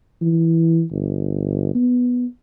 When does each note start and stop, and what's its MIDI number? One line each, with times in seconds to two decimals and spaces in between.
0.21 0.84 52
0.91 1.72 31
1.75 2.26 59